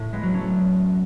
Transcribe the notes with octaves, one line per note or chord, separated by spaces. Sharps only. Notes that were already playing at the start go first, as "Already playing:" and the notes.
Already playing: A2
G#3 B3
F#3
A3 C#4